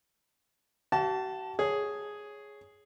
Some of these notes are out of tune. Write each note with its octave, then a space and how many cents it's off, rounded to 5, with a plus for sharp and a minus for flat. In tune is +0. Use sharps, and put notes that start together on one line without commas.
F#4 +45 F5 -15 A5 +0
G#4 +0 C#5 +0